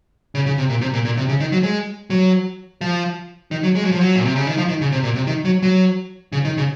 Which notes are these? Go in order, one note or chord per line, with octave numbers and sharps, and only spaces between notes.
C#3
C#3
C3
A#2
C3
A#2
A#2
C3
C#3
D#3
F#3
G#3
F#3
F3
D#3
F#3
G#3
F#3
F3
F#3
A#2
C3
C#3
D#3
F3
D#3
C#3
C3
A#2
C3
D#3
F#3
F#3
C#3
D#3
C#3